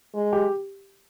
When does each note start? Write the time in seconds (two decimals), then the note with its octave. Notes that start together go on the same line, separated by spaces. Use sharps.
0.15 G#3
0.33 G4